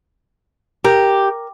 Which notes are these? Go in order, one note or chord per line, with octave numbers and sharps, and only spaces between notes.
G4 A#4